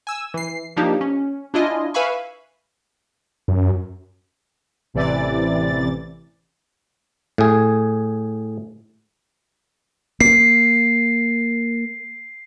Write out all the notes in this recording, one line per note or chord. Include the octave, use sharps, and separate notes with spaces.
G#5 E6
E3 C7
F3 A#3 D4 D#4 G4
C#4
D4 E4 F4 D#5 G#5
B4 E5 F5 G#5 B5 C#6
F#2
A1 C3 E3 D5 A6
A2 G#4
A#3 C7